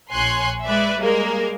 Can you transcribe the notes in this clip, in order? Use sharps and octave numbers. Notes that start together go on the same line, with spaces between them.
A#1 C#5 G#5 C6 F#6
G#3 B4 D5 E5
G3 G#3 A#3 A#4